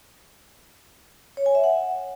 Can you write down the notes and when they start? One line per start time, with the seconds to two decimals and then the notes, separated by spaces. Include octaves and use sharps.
1.37 C#5
1.46 G#5
1.55 E5
1.64 F#5